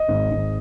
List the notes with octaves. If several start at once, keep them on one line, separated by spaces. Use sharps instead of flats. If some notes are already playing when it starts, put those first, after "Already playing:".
Already playing: D#5
G#1
G#1